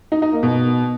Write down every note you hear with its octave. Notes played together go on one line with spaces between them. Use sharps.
D#4
D#4
A#3
B2